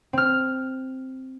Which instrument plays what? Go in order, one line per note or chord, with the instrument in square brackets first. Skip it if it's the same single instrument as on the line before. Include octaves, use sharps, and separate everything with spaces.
[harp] C4 F6